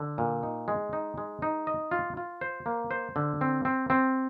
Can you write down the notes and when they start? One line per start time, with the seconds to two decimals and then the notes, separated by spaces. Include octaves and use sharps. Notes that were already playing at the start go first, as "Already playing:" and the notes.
Already playing: D3
0.18 A#2
0.43 D#4
0.68 G#3
0.93 D#4
1.18 G#3
1.42 D#4
1.67 D#5
1.91 F4
2.17 F4
2.41 C5
2.66 A#3
2.91 C5
3.16 D3
3.41 C4
3.65 C4
3.90 C4